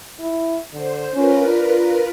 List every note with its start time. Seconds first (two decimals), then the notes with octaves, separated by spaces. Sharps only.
0.20 E4
0.73 D3 C5
1.15 C#4 F4 A#4 B4
1.47 D4